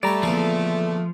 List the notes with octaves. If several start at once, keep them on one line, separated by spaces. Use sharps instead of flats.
G3 A3 C#5 D5 A#5
E2 A#2 D3 F3